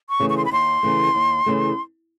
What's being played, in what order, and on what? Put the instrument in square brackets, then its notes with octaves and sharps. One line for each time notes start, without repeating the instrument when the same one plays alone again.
[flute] C#6
[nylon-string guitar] C#3 E3 A3
[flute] C#6
C6
B5
[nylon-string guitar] D#2 [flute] C6
[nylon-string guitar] C#3 E3 A3
D#2
C#3 E3 A3